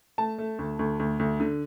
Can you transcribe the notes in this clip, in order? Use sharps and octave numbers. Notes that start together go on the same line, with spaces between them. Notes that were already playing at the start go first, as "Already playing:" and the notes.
A3 A5
A3
D2
D2
D2
D2
D3